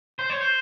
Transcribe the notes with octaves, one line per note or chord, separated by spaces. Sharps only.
C5
C#5
C5